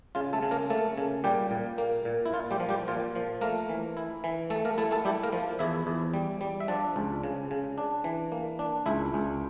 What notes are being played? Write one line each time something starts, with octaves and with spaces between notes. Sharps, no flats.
C#3 F4
A3 A4
C#3
A#3 A#4
A3 A#3 A4
C#3
A#2 G3 G4
A#2
A#3
A#2
E4
A#2 F4
G3 G4
F3
G3 G4
A#2 F4
F3
A3 A#3 A#4
E3
E4
E3
A3 A4
A#3 A#4
A3 E4 A4
A3 A4
G3 E4 G4
A#3 A#4
F3
E2 E4 E5
E2
G3
G3
E5
F3 D4 D5
C#2
C#3
C#3
D4
E3
A#3
D4
C#2 E4 E5
C#2